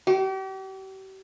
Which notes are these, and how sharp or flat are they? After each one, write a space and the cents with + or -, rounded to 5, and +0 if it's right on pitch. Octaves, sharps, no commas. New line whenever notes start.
G4 -40